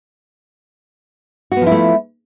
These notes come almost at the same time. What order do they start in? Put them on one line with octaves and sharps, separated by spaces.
F#4 B3 F3 E4 A3